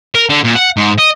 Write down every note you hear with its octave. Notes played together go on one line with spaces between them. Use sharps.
A#4
D3
A#2
F#5
G#2
D#5